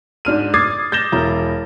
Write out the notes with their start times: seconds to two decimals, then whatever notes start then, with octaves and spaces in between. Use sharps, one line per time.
0.25 G#2 D4 F6 D#7
0.54 D6 D#6 G#6 A6 C7
0.92 G6 A6 A#6 E7 G7
1.12 E1 E4 A#5